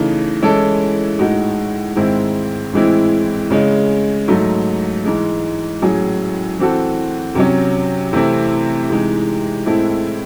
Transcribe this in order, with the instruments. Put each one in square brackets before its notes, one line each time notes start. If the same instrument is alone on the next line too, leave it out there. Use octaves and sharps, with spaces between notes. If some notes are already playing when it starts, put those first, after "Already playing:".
Already playing: [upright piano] C#3 E3 A3 D#4
E3 G#3 C#4 E4 A4
A2 G#3 D#4 F#4
G#2 D#3 G#3 C4 E4
A2 E3 G#3 C4 E4
C#3 G#3 C#4
G#2 F#3 A3 D#4
G#2 E3 G#3
A2 F#3 C#4 G#4
E3 C4 F#4 A4
C3 F#3 C#4
C3 E3 A3 C4 E4
C3 E3 G#3 D#4
A2 G#3 C4 E4 A4